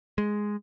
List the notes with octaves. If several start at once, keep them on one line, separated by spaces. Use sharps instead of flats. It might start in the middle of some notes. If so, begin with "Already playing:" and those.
G#3